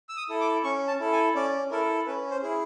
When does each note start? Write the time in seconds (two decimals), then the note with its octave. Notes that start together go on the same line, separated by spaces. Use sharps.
0.09 E6
0.17 D#6
0.29 E4 A4
0.41 D6
0.64 C#4 C#6
0.88 A5
1.00 E4 A4
1.12 G#5
1.35 C#4 D5
1.71 E4 A4 A#4
2.06 C#4 B4
2.31 C5
2.42 E4 G#4